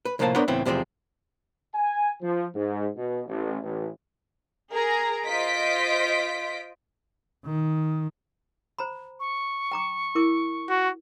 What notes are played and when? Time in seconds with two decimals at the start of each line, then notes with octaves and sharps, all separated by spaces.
0.05 B4
0.19 A2 C3 F3 A#3 C5 A5
0.35 B3 D4 A#4 C5 C#5 F#5
0.48 C#2 A2 E3 B3 C4
0.65 E2 C3 F3 G3 G#3 C4
1.74 G#5
2.22 F3
2.54 G#2
2.96 B2
3.27 A1
3.62 A1
4.71 G#4 A#4 A#5
5.26 F4 C5 D#5 B6 D7
7.45 D#3
8.78 C5 A#5 B5
9.20 C#6
9.72 G5 A#5 D6
10.15 E4 A#4 D6
10.69 F#4